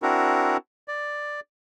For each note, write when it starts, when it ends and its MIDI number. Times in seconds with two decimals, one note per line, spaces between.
0.02 0.57 60
0.02 0.57 62
0.02 0.57 64
0.02 0.57 66
0.02 0.57 70
0.88 1.40 74